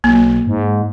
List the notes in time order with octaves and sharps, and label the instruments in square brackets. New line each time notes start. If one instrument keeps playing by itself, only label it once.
[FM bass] B1 [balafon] A#3
[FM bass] G#2